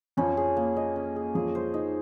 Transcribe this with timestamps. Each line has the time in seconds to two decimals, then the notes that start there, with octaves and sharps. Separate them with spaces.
0.17 F2 F3 C#4
0.37 G#4
0.57 A#3
0.77 D#5
0.96 C#4
1.16 G#4
1.35 F2 F3 G#4
1.55 C5
1.74 D#4